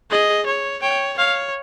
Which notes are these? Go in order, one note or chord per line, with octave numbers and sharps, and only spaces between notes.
G#4 D#5
C#5
C#5 G5
C#5 F5